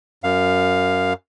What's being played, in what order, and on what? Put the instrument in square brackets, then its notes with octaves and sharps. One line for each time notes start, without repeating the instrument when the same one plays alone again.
[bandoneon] F#2 F5